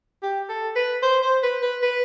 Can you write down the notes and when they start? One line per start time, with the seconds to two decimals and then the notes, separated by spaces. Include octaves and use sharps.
0.22 G4
0.49 A4
0.76 B4
1.03 C5
1.22 C5
1.43 B4
1.62 B4
1.82 B4